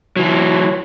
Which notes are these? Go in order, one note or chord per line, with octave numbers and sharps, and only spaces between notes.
E3 F#3